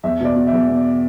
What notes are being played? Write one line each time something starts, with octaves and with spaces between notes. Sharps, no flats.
E2 E5
B2 D5
B2
E5
E2
B2